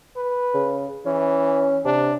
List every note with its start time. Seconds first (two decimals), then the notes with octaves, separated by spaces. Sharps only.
0.17 B4
0.54 C#3
1.06 E3 C#4
1.85 C3 D4